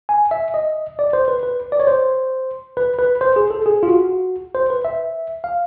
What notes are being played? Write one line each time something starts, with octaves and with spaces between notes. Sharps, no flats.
G#5
E5
D#5
D5
C5
B4
B4
D5
C#5
C5
B4
B4
C5
G#4
A4
G#4
F4
F#4
C5
B4
E5
F5